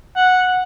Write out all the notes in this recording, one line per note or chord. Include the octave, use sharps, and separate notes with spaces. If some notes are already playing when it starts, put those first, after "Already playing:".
F#5